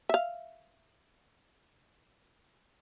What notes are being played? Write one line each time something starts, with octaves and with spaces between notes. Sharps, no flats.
E5 F5